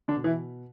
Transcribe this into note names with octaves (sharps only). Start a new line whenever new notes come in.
D3 D4
B2
E3 E4